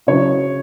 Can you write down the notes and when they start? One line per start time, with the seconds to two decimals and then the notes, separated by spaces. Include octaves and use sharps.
0.07 C#3 F#3 C#4 E4 C#5